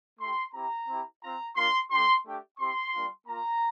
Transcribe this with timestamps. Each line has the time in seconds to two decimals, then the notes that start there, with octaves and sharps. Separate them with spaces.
0.20 A3 E4 G4 C6
0.54 C4 E4 G4 A#5
0.88 C4 E4 G4
1.22 C4 F4 A#5
1.56 A#3 D4 F4 C6
1.90 A3 D4 G4 C6
2.25 A3 D4 G4
2.59 C4 E4 G4 C6
2.94 G3 A#3 D4 F4
3.27 A#3 F4 A#5